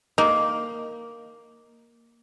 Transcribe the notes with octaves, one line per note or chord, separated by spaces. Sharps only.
A#3 D#4